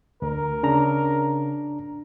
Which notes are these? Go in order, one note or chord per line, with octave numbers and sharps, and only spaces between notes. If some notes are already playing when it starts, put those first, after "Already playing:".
D2 A#4
C#3 D4 A#5